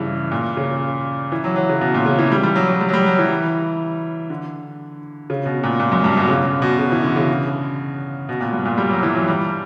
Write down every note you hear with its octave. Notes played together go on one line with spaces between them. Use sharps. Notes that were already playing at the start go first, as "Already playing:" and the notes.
Already playing: G2 C#3 E3
A#2
C#3
E3
F#3
F#3
C#3
B2
A#2
C#3
E3
G3
G3
F#3
F#3
G3
F#3
G3
F#3
E3
D3
C#3
B2
A#2
A#2
F#2
G2
B2
C#3
B2
C#3
E3
D3
C#3
B2
A#2
G2
A#2
G3
F#3
E3
F#3
G3